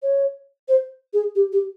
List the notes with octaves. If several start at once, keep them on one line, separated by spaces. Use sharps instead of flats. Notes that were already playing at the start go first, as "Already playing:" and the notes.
C#5
C5
G#4
G4
G4